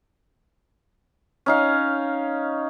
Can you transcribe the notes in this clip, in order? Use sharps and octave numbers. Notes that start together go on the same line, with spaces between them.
C#4 D#4 F5